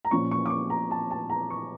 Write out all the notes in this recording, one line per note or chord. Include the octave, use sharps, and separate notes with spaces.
A#5
A#2 F3 C#4 C#6
C#6
D6
C#6
A#5
A5
A5
A#5
C#6